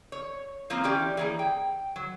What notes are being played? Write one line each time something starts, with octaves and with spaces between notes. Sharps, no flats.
C#5
F3 A#3 C4 F4
E3 C#4 G4 D5
E3 A#3 G#4
G5
F#3